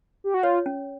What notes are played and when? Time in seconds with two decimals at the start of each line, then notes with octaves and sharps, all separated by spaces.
0.24 G4
0.34 F#4
0.43 F4 C#5
0.66 C#4